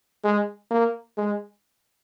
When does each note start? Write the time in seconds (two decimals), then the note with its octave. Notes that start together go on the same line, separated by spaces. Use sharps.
0.24 G#3
0.71 A#3
1.18 G#3